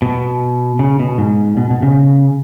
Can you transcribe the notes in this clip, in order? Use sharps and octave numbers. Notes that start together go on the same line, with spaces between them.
B2
C#3
B2
G#2
B2
B2
C#3